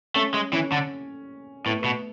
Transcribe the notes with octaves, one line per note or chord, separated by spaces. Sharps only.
A3 C#4
G#3
E3 C#4
D3
A2 B3
A3
B2 B3